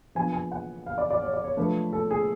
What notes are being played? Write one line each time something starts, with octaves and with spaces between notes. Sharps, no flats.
F3 B3 D4 G#5
G#5
F#5
F5
D5
D5
C#5
D5
C#5
F3 A3 D4 B4
A4
G#4